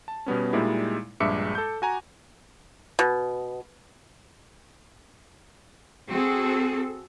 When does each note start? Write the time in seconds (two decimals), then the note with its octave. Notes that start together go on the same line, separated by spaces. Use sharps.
0.08 A5
0.26 B2 G3 B3 C#4
0.53 A#2 G3 G#3 D#4 E4
1.20 A#1 G2 G#3 E5 D6 C#7
1.55 A4 G6
1.82 F#4 G#5 A#5
2.99 B2
6.09 C4 F#4 G#4 A4